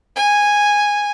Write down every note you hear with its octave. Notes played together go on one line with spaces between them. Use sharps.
G#5